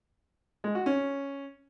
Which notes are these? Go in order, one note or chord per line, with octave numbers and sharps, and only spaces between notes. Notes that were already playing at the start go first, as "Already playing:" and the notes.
G#3
F#4
C#4